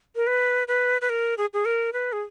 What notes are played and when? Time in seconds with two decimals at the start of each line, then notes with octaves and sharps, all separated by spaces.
0.16 A#4
0.27 B4
0.68 B4
1.01 B4
1.10 A#4
1.38 G#4
1.53 G#4
1.65 A#4
1.93 B4
2.13 G#4